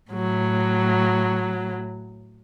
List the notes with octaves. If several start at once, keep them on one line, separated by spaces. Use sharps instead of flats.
A2 F#3